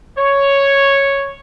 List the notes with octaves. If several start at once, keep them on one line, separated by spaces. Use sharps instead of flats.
C#5